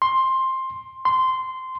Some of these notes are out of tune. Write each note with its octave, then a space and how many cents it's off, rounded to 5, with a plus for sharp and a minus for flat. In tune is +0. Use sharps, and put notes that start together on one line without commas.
C6 +10
C6 -15